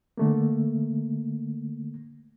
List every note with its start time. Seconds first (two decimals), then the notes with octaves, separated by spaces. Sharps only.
0.17 D3 A3 A#3